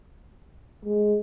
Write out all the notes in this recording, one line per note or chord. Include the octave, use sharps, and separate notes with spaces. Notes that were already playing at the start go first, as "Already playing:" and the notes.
G#3